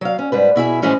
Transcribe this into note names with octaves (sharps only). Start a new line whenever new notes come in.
F#3 F5
C#4
G#2 G3 B4
B2 E4 G#4 E5
A2 E3 F3 G#3 C#4 E4